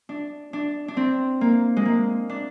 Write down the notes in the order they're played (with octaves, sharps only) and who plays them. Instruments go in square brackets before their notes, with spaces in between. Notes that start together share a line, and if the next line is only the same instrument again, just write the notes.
[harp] D4
D4
D4
C4
A#3
G#3
A#3
D4